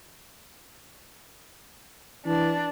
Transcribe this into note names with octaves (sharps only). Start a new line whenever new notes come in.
E3 D4